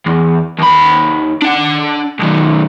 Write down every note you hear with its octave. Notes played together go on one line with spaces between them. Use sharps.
E2
D#2 B5
D4 F#5
B1 D#3